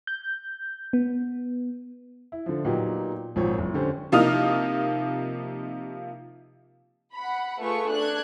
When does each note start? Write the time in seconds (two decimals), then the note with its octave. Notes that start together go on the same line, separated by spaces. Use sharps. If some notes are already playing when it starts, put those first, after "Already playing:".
0.07 G6
0.93 B3
2.32 E4
2.46 D3 F3
2.65 A#2 F#3 B3 D#4 G4
3.36 G#1 A#2 F3 C#5
3.58 F#1
3.74 D3 C#4 G4 C5
4.12 C3 F3 A#3 D#4 D#6 F6
7.14 F#5 B5
7.60 A3 F4 G#4 B4 C#6
7.91 D4 F#6 G#6